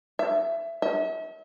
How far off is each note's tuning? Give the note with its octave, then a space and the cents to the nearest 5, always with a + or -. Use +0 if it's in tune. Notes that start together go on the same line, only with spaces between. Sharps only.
E5 +20
E5 -40